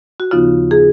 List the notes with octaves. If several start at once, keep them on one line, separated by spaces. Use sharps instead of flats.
F#4
D#2 C#3 F3 B3 D#4 F4
G#4